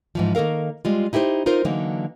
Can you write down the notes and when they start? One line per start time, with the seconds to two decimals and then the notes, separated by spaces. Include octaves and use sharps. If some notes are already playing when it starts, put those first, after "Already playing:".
0.15 G#2 E3 F3
0.35 D#3 A#3 A4 A#4 F5
0.85 G3 G#3 F4
1.13 D#4 E4 G4 A4 C5
1.46 D#4 F4 A#4 C5
1.65 D3 E3 F#3 A#3 D#4